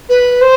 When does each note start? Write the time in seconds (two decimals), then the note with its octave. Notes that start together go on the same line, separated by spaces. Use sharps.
0.09 B4
0.41 C5